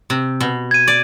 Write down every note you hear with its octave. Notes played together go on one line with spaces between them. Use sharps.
C3
B2
G#6 D#7
D5